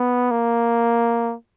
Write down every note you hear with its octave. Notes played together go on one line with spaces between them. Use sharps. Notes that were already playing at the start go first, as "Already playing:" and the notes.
Already playing: B3
A#3